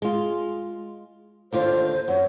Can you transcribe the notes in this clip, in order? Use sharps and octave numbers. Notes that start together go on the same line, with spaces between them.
G#3 F4
D#2 D3 F4 C5
F#2 C#5